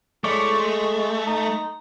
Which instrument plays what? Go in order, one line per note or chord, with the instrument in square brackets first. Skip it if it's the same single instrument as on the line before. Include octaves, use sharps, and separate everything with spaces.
[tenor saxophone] G#3 [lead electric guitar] A3 [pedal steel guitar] E4 C#5 D5
[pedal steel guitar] C6
[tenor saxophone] D#4